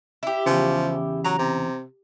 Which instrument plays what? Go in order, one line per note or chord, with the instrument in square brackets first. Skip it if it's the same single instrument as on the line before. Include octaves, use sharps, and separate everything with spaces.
[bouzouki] E4 G4
[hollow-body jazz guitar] E2 C#3 [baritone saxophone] F3
[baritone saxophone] F#3 [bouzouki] A#5
[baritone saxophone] C3